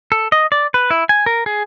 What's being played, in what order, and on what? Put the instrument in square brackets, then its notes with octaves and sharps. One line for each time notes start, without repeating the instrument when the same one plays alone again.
[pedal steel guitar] A4
D#5
D5
B4
E4
G#5
A#4
G#4